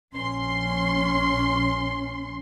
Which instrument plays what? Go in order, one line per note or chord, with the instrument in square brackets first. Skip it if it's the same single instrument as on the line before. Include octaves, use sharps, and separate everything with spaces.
[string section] A#1 C6 [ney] C#4